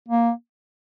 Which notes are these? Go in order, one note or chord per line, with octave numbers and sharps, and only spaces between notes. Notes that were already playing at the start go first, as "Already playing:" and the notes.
A#3